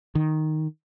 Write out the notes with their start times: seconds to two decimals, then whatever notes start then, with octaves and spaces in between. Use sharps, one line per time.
0.15 D#3